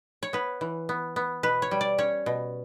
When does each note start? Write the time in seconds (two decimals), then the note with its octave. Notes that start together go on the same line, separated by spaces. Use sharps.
0.23 C#5
0.33 B3 B4
0.61 E3
0.89 B3
1.16 B3
1.43 B2 B4
1.62 C#5
1.71 G3
1.81 D5
1.98 C#4 C#5
2.26 B2